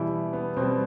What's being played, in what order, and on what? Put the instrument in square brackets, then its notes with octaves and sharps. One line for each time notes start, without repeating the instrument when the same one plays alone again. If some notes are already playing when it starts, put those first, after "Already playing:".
Already playing: [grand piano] B2 E3 G3 E4
B3
B2 G3 C4